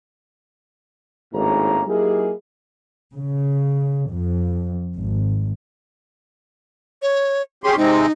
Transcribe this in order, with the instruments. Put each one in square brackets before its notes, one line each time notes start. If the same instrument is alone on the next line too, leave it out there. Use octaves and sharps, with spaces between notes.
[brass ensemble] G#1 A2 A#3 C#4 D#4 A#5
F#3 A#3 D#4 E4 G4 G#4
[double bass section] C#3
F2
G#1
[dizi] C#5
[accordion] C#4 G4 C6 [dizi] G#4
[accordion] C3 G#3 C4 [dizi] D#4